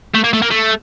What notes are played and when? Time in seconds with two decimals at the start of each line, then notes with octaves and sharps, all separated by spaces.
0.15 A3
0.24 A#3
0.33 A3
0.42 A#3
0.51 A3